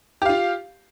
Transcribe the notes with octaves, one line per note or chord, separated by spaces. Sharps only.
F4 G4 F5